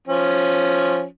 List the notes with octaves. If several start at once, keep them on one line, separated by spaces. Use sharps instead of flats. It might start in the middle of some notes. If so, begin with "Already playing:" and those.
F3 C#4